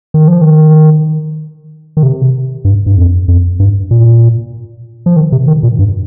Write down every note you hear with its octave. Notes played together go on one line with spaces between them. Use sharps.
D#3
F3
D#3
D#3
C3
G2
G2
F2
F2
G2
A#2
F3
D#3
C3
D#3
A#2
G2